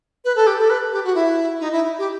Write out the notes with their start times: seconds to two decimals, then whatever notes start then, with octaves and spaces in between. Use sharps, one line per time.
0.25 B4
0.36 A4
0.47 G4
0.58 A4
0.70 B4
0.92 G4
1.04 F#4
1.15 E4
1.60 D#4
1.72 E4
1.99 G4